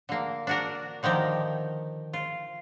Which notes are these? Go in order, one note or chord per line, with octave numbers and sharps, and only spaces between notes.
D3 A#3
D4 F#4 A#4
D3 D#3 F3 G4 A#4
F4